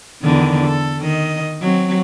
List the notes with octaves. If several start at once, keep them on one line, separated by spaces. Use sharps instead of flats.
E2 D3 D#3
A4
D#3 D#5
F#3 C4